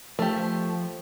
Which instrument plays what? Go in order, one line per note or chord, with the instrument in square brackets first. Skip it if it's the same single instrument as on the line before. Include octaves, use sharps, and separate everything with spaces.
[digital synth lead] F3 [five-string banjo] A3 G4